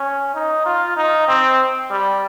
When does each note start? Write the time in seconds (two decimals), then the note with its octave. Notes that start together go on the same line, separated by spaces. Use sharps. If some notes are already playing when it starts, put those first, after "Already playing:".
Already playing: C#4
0.34 D#4
0.65 F4
0.96 D#4
1.28 C4
1.91 G3